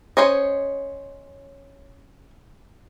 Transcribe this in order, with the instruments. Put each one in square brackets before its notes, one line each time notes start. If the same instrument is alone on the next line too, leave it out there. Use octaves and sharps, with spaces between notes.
[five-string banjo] C#4 C5 C#5 D#5